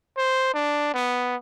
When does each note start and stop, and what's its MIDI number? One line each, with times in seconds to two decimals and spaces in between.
0.18 0.52 72
0.54 0.93 62
0.94 1.36 59